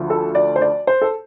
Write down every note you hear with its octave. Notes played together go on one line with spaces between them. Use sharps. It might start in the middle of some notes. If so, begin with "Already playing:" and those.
Already playing: D2 D3 F3
A4
D5
C5
D5
C5
A4